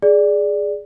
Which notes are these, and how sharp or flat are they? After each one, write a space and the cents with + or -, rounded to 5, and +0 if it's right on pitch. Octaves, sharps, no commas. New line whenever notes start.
G#4 +0 D5 +0